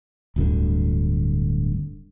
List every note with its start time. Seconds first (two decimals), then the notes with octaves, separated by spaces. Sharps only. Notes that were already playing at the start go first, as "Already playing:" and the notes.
0.36 D1 D2 G2 D3